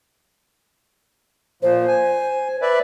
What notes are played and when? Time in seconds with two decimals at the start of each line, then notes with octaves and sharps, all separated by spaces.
1.62 A#2 F3 C5
1.88 G#5
2.62 B4 D5 E5